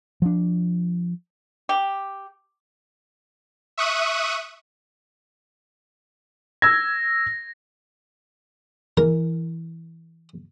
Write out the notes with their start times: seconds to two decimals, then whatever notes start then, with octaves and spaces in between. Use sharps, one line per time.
0.22 F3 D4
1.69 G4
3.77 E5 C#6 D#6 F#6 D#7
6.62 E6 G#6 A#6
8.97 E3 A#4